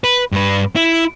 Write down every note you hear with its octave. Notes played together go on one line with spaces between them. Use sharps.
B4
G2 B4
E4